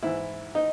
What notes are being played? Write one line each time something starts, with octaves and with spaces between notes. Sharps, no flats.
G#2 E3 E4
D#4